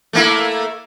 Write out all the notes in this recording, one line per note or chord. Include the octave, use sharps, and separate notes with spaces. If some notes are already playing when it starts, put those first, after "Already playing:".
A3 A#3 E4